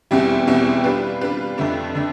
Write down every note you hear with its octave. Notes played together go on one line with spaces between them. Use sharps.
E2 B2 G3 C4 E4
E2 B2 G3 C4 E4
G3 D4 F4 B4
G3 D4 F4 B4
F2 D3 A3 D4
D3 A3 D4